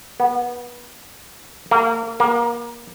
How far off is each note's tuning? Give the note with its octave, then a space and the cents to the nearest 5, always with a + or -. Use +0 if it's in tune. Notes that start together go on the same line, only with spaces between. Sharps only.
B3 -25
A#3 -30
A#3 +25